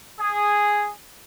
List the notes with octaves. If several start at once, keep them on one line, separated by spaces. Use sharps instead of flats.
G#4